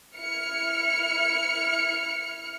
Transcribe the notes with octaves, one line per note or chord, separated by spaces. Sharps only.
E4 F6 C#7